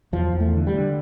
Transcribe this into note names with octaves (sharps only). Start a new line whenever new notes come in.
E2 F3
E2
A3
D3
G3
D3